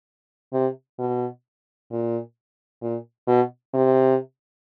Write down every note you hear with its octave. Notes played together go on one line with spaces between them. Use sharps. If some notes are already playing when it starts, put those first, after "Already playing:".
C3
B2
A#2
A#2
B2
C3